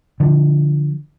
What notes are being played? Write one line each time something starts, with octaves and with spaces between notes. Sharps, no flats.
D3 F3